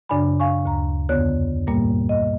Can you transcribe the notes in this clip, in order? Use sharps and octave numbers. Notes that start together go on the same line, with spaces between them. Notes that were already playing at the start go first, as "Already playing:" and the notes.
F#2 C#3 D4 D5 G#5 B5
F5 G#5 C#6
D2 A#5
F2 D3 B3 C#5 F#6
G2 A#2 G3 A#3
D#5